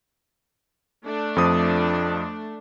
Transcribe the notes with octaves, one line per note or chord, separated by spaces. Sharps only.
A3 D4
F2 F3 D#6